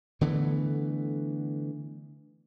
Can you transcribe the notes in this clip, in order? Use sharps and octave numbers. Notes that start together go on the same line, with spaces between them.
D3 E3 A3 B3